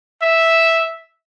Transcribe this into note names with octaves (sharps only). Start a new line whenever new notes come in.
E5